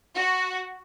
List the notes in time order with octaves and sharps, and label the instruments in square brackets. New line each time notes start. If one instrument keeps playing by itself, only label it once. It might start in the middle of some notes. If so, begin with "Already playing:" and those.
[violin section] F#4